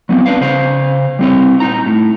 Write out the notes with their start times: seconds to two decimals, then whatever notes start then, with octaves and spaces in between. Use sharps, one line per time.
0.09 F#3 B3 C4
0.26 C#4 D4 B4 F5
0.41 C#3 C5 F5
1.19 G3 C4 C#5
1.60 A#2 D#4 A#5
1.86 A2